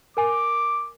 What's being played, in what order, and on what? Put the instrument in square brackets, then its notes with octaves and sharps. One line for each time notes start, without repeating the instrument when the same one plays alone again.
[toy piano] A#4 G#5 [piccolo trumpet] D6